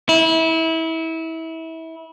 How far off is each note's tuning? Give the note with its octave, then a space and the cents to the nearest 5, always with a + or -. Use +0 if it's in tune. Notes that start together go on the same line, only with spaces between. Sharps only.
E4 -25